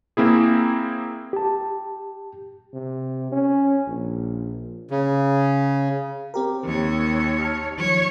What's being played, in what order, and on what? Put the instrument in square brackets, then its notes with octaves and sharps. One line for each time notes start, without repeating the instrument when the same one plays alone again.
[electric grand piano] A#3 C4 E4 G#4
[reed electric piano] G4 A5
[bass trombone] C3
C#4
A#1
[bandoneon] C#3
[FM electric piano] C4 G4 A#4
[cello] D#2 C#5
[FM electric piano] A5 F6
[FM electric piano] D#3 F3 F#3 [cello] C#5